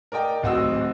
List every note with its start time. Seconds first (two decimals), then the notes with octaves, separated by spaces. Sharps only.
0.12 A#4 D5 D#5 G5
0.42 D1 D#2 C4 F#4 D#5 E6